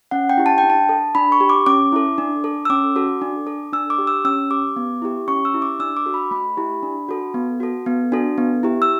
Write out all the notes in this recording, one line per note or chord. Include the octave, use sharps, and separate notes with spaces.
C#4 F#5
G5
E4 G4
A5
G5
D4
A5
A4
D4 B5
C#6
G4
D6
C#4 D6
E4 A4
D4
A4
E6
C#4 D6
F#4 A4
D4
A4
D4 E6
D6
G4
E6
C#4 E6
G4 D6
B3
E4 G4
C#4 C#6
E6
E4 G4
D6
D4 E6
D6
F#4 A4
B5
A3 B5
E4 G4
D4
F#4 A4
B3
F#4 A4
B3
D4 F#4 A4
B3
E4 G4
E6